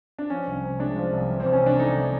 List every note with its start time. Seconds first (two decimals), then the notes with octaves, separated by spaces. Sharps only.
0.19 D4
0.30 F3 C#4
0.47 C2
0.63 C3
0.79 G#3 D4
0.96 F3
1.13 C2
1.29 E3
1.40 C4
1.46 C2
1.53 C#4
1.62 C3 D4
1.79 A3 D#4
1.96 E3